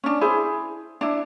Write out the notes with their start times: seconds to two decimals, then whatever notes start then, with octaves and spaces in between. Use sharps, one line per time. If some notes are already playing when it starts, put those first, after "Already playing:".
0.04 C#4 D4
0.21 E4 G#4 C5
1.01 D4 E4